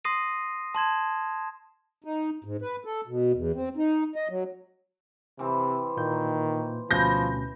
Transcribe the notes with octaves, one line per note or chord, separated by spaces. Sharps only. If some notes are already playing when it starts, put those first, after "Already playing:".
C6 D#6 A#6 C7 D#7
A5 C6 G#6 E7
D#4
G#2
B4
A4
B2
E2
C4
D#4
D#5
F#3
C3 E3 C4
A#2 D#3 A#3 G6
D2 B2 F3 C#4 A5 B5 G6 A#6